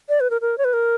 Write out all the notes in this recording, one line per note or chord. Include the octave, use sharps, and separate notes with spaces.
D5
B4
A#4
A#4
C#5
B4
A#4